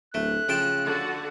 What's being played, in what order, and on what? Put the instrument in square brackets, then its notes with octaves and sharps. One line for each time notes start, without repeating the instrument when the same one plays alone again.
[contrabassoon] D1 [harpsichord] A3 [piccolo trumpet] F#6
[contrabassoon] C#3 [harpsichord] F3 G5 A5
[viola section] D3 F#4 F#5